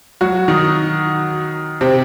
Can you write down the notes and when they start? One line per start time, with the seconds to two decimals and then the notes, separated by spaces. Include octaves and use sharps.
0.21 F#3 F#4
0.48 D#3 D#4
1.81 C3 C4